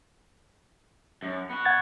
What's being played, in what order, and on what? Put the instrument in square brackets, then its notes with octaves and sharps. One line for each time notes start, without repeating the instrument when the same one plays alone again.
[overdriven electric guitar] F#2
B3 F#4
[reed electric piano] F#5 G#6 A6